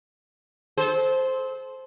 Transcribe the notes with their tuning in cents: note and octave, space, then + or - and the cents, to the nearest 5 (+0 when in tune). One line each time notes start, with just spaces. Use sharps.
A4 -35 C5 +0